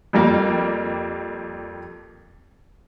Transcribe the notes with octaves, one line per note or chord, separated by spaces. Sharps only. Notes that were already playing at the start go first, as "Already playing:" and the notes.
F2 G3 A#3